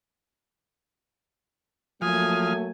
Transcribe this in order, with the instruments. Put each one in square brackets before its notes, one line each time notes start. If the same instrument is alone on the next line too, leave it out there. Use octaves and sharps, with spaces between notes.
[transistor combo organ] F3 F6 [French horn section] F#3 A3 A#3 [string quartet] G#5 [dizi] D#6